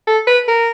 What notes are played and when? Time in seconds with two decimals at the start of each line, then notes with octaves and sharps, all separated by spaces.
0.07 A4
0.27 B4
0.48 A#4